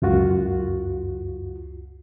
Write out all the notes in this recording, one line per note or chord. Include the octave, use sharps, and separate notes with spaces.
C#2 F#2 F4 F#4